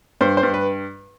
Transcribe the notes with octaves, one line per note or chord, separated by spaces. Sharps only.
G2 C5
C5
G2
B4